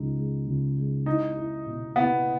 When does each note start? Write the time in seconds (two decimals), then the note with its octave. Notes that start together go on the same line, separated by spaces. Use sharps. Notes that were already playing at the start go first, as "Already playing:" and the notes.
Already playing: C#2 G#3 D#4
0.16 G#3
0.47 C#2
0.77 G#3
1.06 D#4 E4
1.36 E4
1.66 B2
1.96 B3 E4